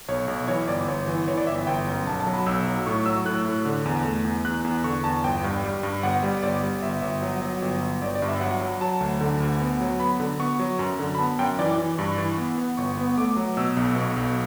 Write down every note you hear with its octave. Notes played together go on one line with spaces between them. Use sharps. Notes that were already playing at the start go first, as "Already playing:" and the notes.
B1 C#5
B1
E3 C#5
G1 D5
G1 C#5
E3
E3 C#5
D5
G1 E5
G1 G5
F#2
B1 A5
A5
F#3
B5
B1 E6
F#3
A2 C#6
F#3 E6
A2 F#6
A2
D3
E2
A3
E2
E2 F#6
E2
D3 C#6
E2 A5
G1 G5
G2
G3
G2
G1 F#5
G3
G1 D5
G3
G1 E5
G1
F#3
F#3
G1
G1
G1 D5
D5
G2
E5
F#3 F#5
F#3
F#3 A5
D2
D3
D2
B3
F#3
B3 B5
D3
B3 C#6
F#3
F#2
D3
B5
B3 A5
F#2 G5
E3 D5
E3
G2 C#6
E3
B3
B3
G1 C#6
B3
A3 D6
F#3
B2 E6
B1
B2 C#6
B1